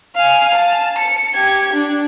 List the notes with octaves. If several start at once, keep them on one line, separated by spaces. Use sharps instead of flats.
F5 G#5
A5
C#7
G4 G#6
D4